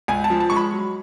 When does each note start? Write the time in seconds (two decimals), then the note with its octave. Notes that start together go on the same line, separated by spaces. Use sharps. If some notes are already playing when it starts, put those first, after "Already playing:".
0.08 C#2 G#5
0.24 A5
0.30 F3
0.40 A5
0.50 G#3 C#6
0.56 B5
0.73 F#3